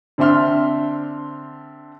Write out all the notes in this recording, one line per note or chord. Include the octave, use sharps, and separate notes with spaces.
D3 C4 D4 E5 C6 F6